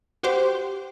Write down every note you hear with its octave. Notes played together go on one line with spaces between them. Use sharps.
F#4 G4 C5